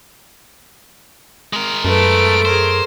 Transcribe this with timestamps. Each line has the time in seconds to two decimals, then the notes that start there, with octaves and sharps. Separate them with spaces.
1.53 G#3 A#4
1.85 F#2 A3 B4 A5 D7
2.45 G#4 A#4 C5